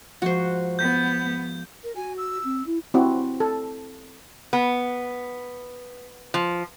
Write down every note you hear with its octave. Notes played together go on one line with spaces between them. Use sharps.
G#2 F3 F#4 C5
B3 G6
A#4
F#4 G#5
E6
C4
E4
C4 E4 F#4
A4
B3
F3